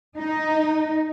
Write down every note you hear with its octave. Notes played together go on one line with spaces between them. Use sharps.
D#4